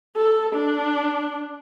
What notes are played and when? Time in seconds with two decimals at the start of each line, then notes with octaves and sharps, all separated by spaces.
0.17 A4
0.55 D4